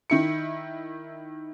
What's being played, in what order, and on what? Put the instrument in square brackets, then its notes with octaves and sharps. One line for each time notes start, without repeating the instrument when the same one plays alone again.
[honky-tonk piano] D#3 E4 C#7